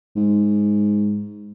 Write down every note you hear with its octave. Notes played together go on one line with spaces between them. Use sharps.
G#2